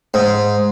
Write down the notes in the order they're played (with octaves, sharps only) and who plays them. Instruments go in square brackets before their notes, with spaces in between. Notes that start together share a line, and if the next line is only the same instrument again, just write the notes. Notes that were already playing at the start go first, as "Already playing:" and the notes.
[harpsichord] G#2